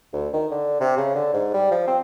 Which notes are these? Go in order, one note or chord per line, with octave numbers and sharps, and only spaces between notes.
D2
D#3
D3
C3
C#3
D3
G#2
G3
F3
C4